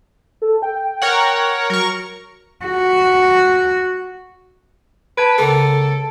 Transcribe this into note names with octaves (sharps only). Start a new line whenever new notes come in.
A4
G5
A#4 C#5 F#5
F#3 A#4 C#6
F#4
B4 A5 G#6 D7
C#2 A#3 A4 A#4